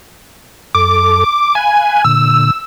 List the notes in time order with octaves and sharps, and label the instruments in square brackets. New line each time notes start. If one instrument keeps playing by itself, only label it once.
[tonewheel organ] F#2 A4 [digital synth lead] D6
[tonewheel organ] F5 B5 F#6 [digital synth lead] G#5
[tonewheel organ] A#2 D3 [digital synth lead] E6